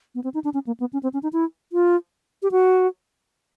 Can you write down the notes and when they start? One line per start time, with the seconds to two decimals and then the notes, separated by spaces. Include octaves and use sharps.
0.15 B3
0.24 C4
0.34 D#4
0.44 D4
0.54 C#4
0.67 A#3
0.80 B3
0.93 C#4
1.03 C4
1.14 C#4
1.23 D#4
1.33 E4
1.72 F4
2.43 G4
2.51 F#4